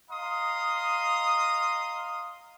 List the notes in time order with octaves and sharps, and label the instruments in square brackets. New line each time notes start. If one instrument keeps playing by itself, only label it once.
[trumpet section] D#5 F5 A#5 C6 D#6